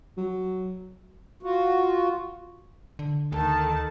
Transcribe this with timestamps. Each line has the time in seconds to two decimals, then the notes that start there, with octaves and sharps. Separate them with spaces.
0.17 F#3
1.43 F4 F#4
2.99 D3
3.32 D2 D#3 A4 A5